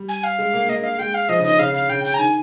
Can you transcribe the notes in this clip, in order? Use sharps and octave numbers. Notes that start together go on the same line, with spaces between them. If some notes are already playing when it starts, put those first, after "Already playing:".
Already playing: G3
G#5
F5
G#3
A#3
A#3 D#5
F5
G#3 G5
F5
F3 D#5
C#3
D#3 D#5
C#3 F5
C#3 F5
C#3 G5
G5
A#5
D#3 G#5